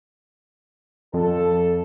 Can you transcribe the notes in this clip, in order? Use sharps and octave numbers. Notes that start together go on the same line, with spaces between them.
F2 A4